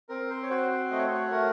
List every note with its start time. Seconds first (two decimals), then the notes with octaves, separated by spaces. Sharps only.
0.09 C4 A#4
0.30 C5
0.43 C#5
0.50 F#4 C5
0.71 C5
0.91 A3 D#5
0.98 C#5
1.07 C5
1.14 C#5
1.31 A3 A#4